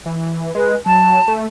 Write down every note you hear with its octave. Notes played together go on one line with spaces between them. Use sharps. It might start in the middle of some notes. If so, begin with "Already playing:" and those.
E3
G#3 B4
F#3 A5
A3